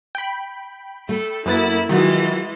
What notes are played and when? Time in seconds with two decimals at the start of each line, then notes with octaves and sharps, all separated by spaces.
0.15 G5 B5
1.09 A3 A4
1.46 F#2 A#3 B3 E4 A6
1.89 D#3 E3 F#3 G#3 F4 F#4